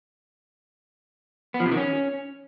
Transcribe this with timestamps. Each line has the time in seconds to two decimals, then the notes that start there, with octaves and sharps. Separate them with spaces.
1.54 B3
1.60 F3
1.66 C3
1.71 D#3
1.77 C#4